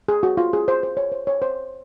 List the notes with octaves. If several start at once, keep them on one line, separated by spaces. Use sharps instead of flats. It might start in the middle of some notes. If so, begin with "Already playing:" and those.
G#4
F#4
F4
G#4
C5
C5
C#5
C5
C#5
C5